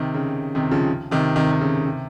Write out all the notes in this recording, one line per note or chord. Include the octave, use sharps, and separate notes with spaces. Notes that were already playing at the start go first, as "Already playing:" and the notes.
Already playing: C3 D#3
C#3
C3 D#3
C#3 F3
C3 D#3
C3 D#3
D#3
C#3
C3